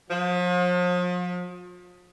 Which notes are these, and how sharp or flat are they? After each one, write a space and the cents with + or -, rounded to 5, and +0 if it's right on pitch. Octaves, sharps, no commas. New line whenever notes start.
F3 +40